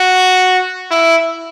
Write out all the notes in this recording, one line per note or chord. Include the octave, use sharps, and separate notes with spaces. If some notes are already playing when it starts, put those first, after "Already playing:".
Already playing: F#4
E4